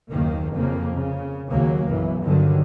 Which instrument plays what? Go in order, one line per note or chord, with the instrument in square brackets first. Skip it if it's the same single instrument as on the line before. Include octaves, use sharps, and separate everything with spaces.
[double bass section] F#1 D#2 D#3 A#3
F2 C#3 A#3
C#3
D#2 C#3 F#3 A#3
B1 F#2 E3
G2 D3 D#3 F#3